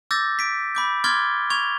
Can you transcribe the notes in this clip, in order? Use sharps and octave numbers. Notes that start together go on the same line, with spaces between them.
D6 E6 G6 A6 A#6
B6 D7
B5 D6 G6
C6 D6 F6 G#6 A6 G7
C#6 G#6 F7 G7